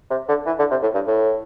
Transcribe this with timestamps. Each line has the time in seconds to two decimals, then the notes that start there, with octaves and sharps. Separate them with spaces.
0.10 C3
0.28 D3
0.46 E3
0.59 D3
0.71 C3
0.82 A2
0.94 G2
1.07 A2